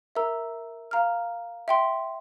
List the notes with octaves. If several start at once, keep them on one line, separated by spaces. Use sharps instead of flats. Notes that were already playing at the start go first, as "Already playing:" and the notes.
A#4 E5 A#5 E6
F5 A#5 F6
E5 G5 C6